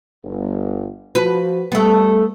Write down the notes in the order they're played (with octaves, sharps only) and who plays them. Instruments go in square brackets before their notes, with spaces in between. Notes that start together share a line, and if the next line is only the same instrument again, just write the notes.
[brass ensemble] G1
[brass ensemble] F3 F4 F#4 [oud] B4
[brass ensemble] G3 [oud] A3 B3